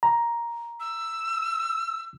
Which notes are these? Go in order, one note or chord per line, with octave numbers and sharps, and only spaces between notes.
A#5
E6